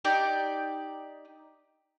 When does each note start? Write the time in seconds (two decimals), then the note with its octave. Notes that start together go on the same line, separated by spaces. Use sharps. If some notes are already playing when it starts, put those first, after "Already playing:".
0.05 D#4 G4 D5